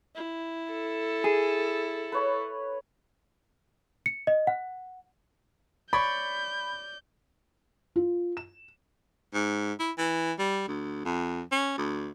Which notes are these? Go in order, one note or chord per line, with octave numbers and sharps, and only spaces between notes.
E4
A4
G#4
B4 C#5 B5
C#7
D#5
F#5
C#5 D5 B5 G6
F4
E7
G#2
E4
E3
G3
D2
F2
C#4
D2